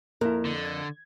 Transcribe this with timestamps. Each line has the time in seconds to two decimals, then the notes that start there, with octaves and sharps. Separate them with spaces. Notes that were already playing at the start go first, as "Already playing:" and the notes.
0.21 F2 A#3 E4 A#4
0.45 D3
0.65 G#6